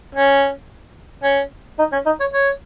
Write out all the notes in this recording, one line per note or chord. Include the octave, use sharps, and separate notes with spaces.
C#4
C#4
D#4
C#4
D#4
C#5
C#5